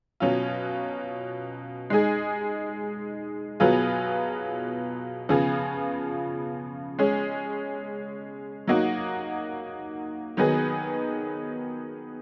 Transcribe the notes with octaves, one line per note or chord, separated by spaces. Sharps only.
B2 F#3 C#4 F4
G#3 D#4 G#4
B2 F#3 B3 F4 G#4
C#3 F3 B3 F4 G#4
G#3 C#4 G#4
F#3 A#3 D#4 F#4
D#3 F#3 B3 D#4 G#4